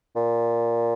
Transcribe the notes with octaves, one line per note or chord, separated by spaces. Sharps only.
A#2